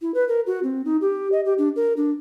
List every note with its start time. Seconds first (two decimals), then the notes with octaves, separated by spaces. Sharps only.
0.01 E4
0.14 B4
0.28 A#4
0.46 F#4
0.63 C4
0.85 D#4
1.01 G4
1.32 D#5
1.45 G4
1.58 D4
1.76 A#4
1.96 D4